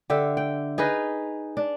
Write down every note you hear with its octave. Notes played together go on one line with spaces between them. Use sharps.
D3 G4 E5
G5
D#4 G#4 B4 D#5
D4